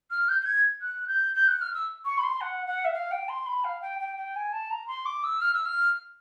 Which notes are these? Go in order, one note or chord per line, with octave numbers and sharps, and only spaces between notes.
F6
G6
G6
G#6
F#6
G6
G6
F#6
F6
E6
C#6
B5
C6
F#5
F#5
E5
F5
G5
C6
B5
F5
G5
G5
G5
G#5
A5
A#5
C6
D6
E6
F6
E6
F6